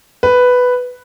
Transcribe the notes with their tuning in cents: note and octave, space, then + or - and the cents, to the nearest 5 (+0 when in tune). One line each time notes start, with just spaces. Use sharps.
B4 +5